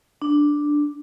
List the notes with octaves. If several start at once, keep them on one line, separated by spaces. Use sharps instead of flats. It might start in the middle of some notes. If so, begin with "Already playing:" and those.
D4